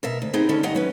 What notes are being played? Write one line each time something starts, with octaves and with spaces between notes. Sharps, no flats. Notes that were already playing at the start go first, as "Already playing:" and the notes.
B2 A#4 E5
D2
B3 C4 D#4 G4 G#4 A#4
D3 D#3 C#4 A4
G2 D#3 G4 D#5 F#5 A#5
F#3 C#4 B4